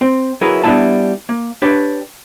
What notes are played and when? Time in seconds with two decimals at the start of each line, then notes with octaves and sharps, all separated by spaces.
0.01 C4
0.41 F#3 E4 G#4 A#4 B4
0.64 G3 B3 D4 E4 E5 A5
1.29 A#3
1.62 D4 G4 B4 C#5